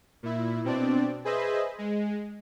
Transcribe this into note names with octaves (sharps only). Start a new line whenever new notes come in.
A#2 E4
B2 C4 D4 D5
G#4 B4 C5 D#5 E5
G#3